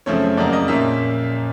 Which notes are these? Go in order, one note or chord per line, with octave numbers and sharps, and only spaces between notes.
F#2 C#3 F3 A3 C4 C#5
F2 C#3 F#3 A#3 D5
D#5
A#2 F3 A#3 C#4 E5